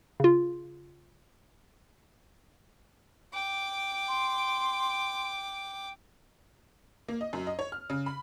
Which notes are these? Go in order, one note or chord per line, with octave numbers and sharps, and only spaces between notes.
C#3 F4
G5 D6
C6
A#3
D#5
F#2
D#5
C#5
F6
C#3
B5